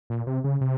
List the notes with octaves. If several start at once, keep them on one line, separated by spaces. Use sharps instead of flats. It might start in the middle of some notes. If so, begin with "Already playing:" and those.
A#2
C3
C#3
C3